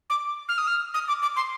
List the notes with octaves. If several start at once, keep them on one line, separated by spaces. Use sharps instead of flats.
D6
F6
D#6
F6
D#6
D6
D6
C6